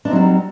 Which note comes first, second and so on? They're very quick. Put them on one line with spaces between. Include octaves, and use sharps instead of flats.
D4 D#4 C4 F#3 G3